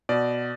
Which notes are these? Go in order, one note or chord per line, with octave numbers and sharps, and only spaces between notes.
B2 D5